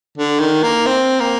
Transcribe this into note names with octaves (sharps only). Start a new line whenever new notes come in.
D3
D#3
A#3
C4
A#3